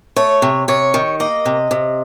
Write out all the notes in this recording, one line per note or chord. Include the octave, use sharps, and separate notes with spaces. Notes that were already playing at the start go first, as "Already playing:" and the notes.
A3 C#5
C3
C3 C#5
D#3
A#3 D#5
C3
C3